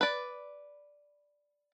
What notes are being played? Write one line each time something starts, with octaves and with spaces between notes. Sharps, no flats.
B4 D5